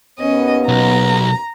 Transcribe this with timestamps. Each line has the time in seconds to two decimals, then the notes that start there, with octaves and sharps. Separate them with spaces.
0.19 D#2 B3 C#4 D#5
0.68 B1 A#5